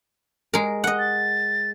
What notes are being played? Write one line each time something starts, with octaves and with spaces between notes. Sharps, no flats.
G#3 A#4
D#5 F#5
A6